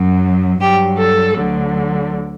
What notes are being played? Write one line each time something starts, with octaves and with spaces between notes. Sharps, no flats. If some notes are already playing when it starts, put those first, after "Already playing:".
Already playing: F#2 F#3
G2 F#3 G4
A4
D2 D3 F#3